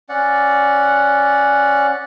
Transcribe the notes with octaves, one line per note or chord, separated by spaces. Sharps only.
C#4 D5 F#5